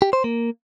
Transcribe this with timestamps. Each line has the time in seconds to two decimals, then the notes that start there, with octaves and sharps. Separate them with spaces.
0.02 G4
0.13 C5
0.24 A#3